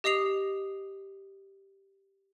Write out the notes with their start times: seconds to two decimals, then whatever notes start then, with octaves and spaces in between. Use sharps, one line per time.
0.04 G4 D#5 D#6 C7 F7